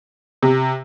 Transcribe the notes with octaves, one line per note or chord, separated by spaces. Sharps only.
C3